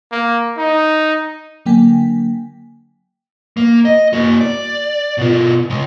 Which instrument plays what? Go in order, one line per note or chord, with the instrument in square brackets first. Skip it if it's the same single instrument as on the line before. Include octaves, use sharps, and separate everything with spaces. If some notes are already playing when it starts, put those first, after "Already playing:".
[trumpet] A#3
D#4
[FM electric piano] D3 F#3 A#3 G5 G#5 B6
[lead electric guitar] A#3
D#5
A#3 F#4
D5
B2 F4
C#3 G#3